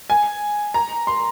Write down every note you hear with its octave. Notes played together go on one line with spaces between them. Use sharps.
G#5
A#5
C6